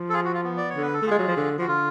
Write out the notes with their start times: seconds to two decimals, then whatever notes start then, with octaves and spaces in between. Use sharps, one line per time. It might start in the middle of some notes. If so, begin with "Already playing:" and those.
Already playing: F3
0.09 A4
0.13 F4 G#4
0.25 F#4
0.34 F4
0.44 B3
0.57 D5
0.70 C#5
0.76 D3
0.82 B4
0.93 A4
1.02 A3
1.07 G#3 F4 G#4
1.19 F#3
1.28 F3
1.37 D3
1.58 F3 F#4
1.68 D3 F4